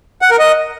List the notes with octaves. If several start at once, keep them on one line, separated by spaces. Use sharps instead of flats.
F#5
A#4
D#5